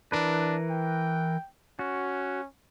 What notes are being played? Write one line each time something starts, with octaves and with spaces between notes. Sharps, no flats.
E3 D4 A#4 B4
G5
C#4 F#4